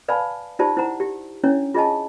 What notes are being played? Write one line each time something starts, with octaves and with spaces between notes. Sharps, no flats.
B4 D5 F5 G#5 A5 B5
D#4 F4 G4 C5 D5 A5
E4 C5 F#5 A#5
G4
C#4 D4 E4 C#5
F4 G#4 D#5 G#5 A5